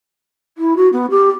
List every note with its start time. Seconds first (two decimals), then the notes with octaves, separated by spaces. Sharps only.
0.57 E4
0.76 F#4
0.92 B3
1.10 G4